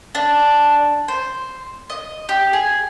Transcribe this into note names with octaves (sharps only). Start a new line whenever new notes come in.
D4
C5
D#5
G4
G#4